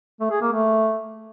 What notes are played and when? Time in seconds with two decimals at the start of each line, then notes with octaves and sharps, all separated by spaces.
0.20 A3
0.31 G#4
0.41 A#3
0.52 A3